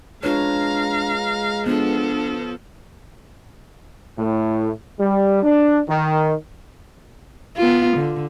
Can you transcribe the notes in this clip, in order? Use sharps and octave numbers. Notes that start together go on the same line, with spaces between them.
G#3 D4 F4 B4 C#5 F5 A#5
F3 B3 D4 A4
A2
G3
D4
D#3
B3 F4
D3